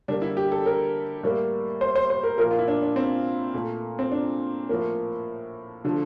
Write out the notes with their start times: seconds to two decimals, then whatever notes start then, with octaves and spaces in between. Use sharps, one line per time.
0.08 D3 G3 A#3 D4
0.22 E4
0.37 G4
0.52 A4
0.66 A#4
1.23 A2 G3 A#3
1.81 C5
1.96 C5
2.10 C5
2.23 A#4
2.38 A#2 F3 A#3 A#4
2.51 F4
2.59 E4
2.68 D4
2.82 D4
2.96 C4
3.54 A#2 A3
3.99 C4
4.12 D4
4.69 A2 F3 A#3
5.85 D3 F3 A3